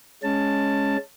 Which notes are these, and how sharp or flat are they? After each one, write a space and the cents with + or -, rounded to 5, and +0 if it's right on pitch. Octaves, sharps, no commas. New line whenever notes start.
G#3 +0 C#4 +0 A5 +10